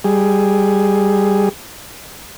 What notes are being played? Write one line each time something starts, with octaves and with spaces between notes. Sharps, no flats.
G3 G#4